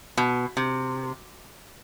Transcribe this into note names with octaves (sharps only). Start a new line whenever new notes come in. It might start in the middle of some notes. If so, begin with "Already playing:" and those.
B2
C3